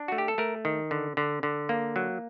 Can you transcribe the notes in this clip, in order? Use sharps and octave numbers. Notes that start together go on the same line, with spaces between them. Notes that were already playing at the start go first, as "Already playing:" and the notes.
Already playing: D4
A3 F#4
G4
A4
A3 A#4
D#3
D3
D3
D3
A#3
F#3